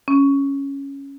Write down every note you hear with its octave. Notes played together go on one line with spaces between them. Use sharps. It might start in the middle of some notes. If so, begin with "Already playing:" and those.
C#4